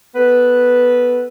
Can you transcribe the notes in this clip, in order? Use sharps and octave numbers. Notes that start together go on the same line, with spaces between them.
B3 A4 B4